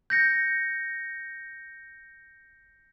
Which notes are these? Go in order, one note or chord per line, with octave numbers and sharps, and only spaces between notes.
G6 A#6 C#7